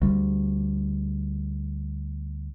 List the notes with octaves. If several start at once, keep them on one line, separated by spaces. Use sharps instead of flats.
D2 G3